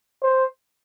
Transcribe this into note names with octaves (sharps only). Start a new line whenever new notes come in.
C5